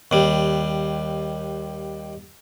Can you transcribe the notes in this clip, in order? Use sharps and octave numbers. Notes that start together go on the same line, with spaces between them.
D#2 G3